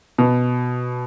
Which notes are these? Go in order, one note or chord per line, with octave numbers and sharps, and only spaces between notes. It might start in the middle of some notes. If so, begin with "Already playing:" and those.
B2